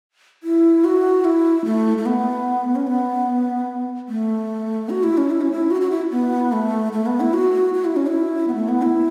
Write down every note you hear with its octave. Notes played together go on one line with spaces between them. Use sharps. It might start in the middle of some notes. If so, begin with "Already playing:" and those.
E4
F#4
E4
A3
A3
B3
C#4
B3
A3
F#4
E4
C#4
E4
C#4
E4
F#4
F#4
E4
B3
A3
A3
B3
E4
F#4
F#4
E4
C#4
E4
B3
A3
B3
E4